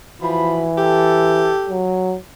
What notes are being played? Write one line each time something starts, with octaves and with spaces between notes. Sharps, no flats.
E3 F3 F#4 B5
G4 A4
F#3